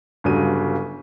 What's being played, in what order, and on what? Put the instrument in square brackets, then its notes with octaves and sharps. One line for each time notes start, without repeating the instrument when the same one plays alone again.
[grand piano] G1 G2 C#3 F#3 G3 D#7